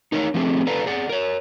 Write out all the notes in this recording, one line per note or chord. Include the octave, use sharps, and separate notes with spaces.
D#4 A#4 C#5 D#5 F5
D3 F3 A3 C4 G4 G#4
A4 B4 D5 F5 A#5
G#4 D5 F#5
A#4 C#5